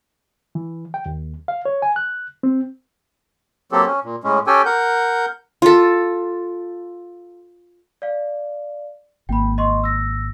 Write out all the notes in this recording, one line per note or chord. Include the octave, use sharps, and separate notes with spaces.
E3
G5
D#2
F5
C#5
G#5
F#6
C4
F#3 A#3 C4 G4 A4
C#4
A#2
A2 G#3 C#4
C#4 G4 A4 G5 G#5
A#4 F#5 G6
F4 A4
D5 F5
G#1 A#3 G5 B5
D#5 C6 C#6
E6 A#6